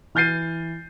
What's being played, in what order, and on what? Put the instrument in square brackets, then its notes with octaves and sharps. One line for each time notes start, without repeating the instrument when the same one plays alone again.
[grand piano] E3 F6 G6 A6 C7 D#7